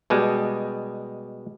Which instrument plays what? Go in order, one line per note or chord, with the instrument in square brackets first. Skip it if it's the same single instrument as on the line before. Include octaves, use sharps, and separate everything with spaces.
[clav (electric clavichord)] B2 G3 G#3